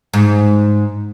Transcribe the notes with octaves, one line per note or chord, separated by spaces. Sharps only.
G#2